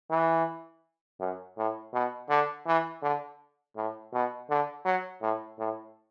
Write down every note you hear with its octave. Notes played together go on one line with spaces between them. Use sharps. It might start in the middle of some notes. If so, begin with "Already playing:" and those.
E3
F#2
A2
B2
D3
E3
D3
A2
B2
D3
F#3
A2
A2